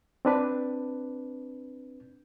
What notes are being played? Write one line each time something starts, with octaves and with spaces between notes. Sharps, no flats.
C4 D4 B4